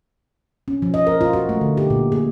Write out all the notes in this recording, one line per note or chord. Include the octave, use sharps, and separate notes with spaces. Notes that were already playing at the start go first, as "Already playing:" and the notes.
C#4
F3
D#5
A#4
F4
F#4
A3
D3
G4
A#2
G#4